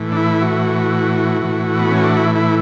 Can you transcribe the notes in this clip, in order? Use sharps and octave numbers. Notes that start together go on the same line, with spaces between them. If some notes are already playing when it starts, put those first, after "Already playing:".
Already playing: A2 E3
D4
E4
F#4
A2 E3
B3
C#4
D4
E4
E4